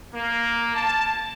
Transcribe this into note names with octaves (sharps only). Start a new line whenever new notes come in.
A#3
A5